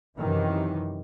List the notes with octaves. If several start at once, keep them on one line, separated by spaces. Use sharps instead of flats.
F#2 C3 D#3 E3